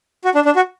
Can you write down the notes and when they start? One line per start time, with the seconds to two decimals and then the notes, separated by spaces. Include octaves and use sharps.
0.25 F#4
0.35 D4
0.45 D4
0.56 F#4